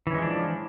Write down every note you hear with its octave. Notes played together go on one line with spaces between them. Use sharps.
E3 F3 G#3 C#4 D4